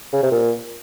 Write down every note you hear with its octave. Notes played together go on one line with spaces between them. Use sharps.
C#3
C3
A#2